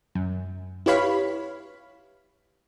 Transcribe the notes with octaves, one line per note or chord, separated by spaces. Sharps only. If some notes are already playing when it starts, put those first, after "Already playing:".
F#2
E4 G4 B4 C#5 F5 B5